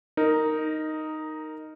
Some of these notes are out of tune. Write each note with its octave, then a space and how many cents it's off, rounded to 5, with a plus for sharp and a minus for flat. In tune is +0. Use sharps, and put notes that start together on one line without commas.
D#4 +0 A#4 -10